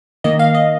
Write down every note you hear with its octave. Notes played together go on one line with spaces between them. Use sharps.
D#3 A#3 D#5
F5
D#5